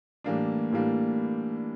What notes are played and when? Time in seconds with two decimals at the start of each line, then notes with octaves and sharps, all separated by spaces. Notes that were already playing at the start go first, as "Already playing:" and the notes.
0.24 A2 E3 G3 A#3 D4
0.72 A2 E3 G3 A#3 D4